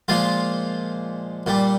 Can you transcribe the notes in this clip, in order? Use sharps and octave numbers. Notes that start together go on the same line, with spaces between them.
A#2 F3 G#3 F4
A#2 G3